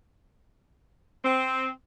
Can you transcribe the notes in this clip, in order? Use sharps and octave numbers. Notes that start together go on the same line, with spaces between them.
C4